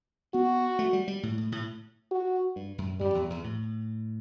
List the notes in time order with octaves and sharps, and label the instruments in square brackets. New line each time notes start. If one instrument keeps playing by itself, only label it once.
[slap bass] B3 [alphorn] F#4
[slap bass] A3
G3
G3
A2
A2
A2
[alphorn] F#4
[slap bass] G2
F#2
[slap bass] F#2 [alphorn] G3
[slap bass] E2
E2
A2